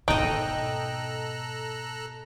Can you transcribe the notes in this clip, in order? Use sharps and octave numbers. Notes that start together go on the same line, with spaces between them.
G#2 B2 D#4 A4 D#5 G5 A#5 F#6